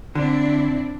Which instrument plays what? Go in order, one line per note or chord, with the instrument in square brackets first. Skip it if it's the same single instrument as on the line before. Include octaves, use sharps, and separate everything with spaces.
[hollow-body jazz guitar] D3 [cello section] C4 D4 E4